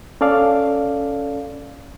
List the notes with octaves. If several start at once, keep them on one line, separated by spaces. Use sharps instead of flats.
C#4 A4 D5 F5